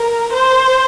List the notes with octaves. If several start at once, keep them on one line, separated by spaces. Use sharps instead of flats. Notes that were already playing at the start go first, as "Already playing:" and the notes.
Already playing: A#4
C5